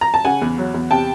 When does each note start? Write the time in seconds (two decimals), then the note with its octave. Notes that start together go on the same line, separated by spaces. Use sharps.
0.01 A#5
0.14 A5
0.25 C#3 F#5 G#5
0.42 E2
0.58 F#3
0.74 E2
0.91 C3 G5 A5